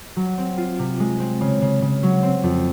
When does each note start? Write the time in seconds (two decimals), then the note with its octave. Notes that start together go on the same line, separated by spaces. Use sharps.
0.16 F#3
0.38 C4
0.58 F4
0.79 C3
1.00 G#3
1.20 C4
1.41 C#3
1.62 C#3
1.82 C#3
2.03 F#3
2.23 C4
2.44 F2